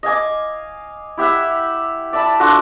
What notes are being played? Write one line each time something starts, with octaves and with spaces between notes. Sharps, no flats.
D#5 F5 G#5 D6
E4 G4 E5 F#5
D5 E5 A5 B5
D4 F4 F#4 A4